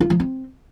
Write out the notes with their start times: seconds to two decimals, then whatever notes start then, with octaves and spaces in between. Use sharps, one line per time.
0.01 F4
0.10 F3
0.20 C4